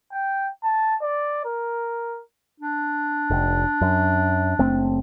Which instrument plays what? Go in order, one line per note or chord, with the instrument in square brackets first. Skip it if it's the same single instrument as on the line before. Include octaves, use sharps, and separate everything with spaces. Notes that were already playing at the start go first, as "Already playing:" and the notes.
[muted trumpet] G5
A5
D5
A#4
[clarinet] D4
[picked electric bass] F1
F#2
F#1 A3 C4